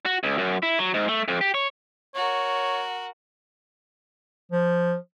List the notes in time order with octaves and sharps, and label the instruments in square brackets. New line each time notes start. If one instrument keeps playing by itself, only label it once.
[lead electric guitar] F#4
C#2
F#2
E4
F#3
G#2
A3
F2
G4
C#5
[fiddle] F#4 A#4 [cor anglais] C#5
[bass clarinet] F3